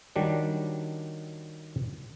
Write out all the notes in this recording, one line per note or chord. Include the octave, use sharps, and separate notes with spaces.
D#3 F#3 G3 D4